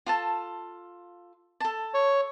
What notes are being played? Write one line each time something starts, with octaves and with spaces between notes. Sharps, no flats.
F4 A4 A5
A4 A5
C#5